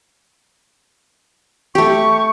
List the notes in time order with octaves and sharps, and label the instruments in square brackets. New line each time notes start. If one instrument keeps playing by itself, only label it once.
[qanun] A3 G4 [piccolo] C#6